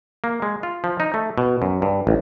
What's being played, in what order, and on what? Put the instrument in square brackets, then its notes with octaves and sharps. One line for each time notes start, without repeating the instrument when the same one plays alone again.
[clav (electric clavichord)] A#3
G#3
F4
F3
D#4
A3
B2
F#2
G2
A1